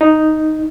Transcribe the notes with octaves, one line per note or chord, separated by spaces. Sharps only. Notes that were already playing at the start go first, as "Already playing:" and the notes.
D#4